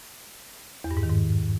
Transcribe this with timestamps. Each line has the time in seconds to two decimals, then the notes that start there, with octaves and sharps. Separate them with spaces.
0.84 E2
0.91 G2
0.97 G#2
1.03 D#3
1.09 G#2